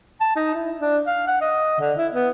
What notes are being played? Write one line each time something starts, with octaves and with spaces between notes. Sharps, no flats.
A5
D#4
E4
D4
F5
F#5
D#5
D3
E4
B3